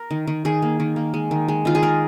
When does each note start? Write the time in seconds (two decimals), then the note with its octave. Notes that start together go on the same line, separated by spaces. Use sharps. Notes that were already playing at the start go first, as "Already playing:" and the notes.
Already playing: A#4
0.11 D#3
0.27 D#3
0.45 D#3 G#4
0.62 A#3
0.80 D#3
0.96 A#3
1.14 G#3
1.31 D#3
1.48 G#3
1.65 D#3 F4
1.75 G#4
1.83 G#3 A#4